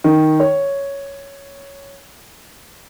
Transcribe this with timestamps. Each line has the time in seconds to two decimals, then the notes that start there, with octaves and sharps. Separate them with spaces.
0.04 D#3
0.40 C#5